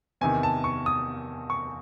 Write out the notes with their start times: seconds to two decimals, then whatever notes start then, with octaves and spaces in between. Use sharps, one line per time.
0.21 E2 C3 D#3 G#5
0.43 A5
0.64 C#6
0.86 D#6
1.50 C#6